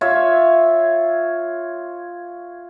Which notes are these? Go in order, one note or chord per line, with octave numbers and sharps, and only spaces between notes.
F4 C#5 E5